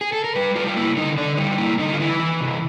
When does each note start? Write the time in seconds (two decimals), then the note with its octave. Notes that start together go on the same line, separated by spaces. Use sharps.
0.01 G#4
0.13 A4
0.24 A#4
0.35 G3 B4
0.55 G3 F4
0.67 F4
0.76 A#3 E4
0.97 D3 D#4
1.17 D3 D4
1.38 G3 D#4
1.51 F4
1.58 A#3 E4
1.79 D3 D#4
1.93 F4
2.00 E3 E4
2.20 E3
2.40 C3